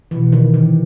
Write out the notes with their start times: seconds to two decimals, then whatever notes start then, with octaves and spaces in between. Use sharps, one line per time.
0.11 B2 E3
0.32 D#3
0.54 C3 E3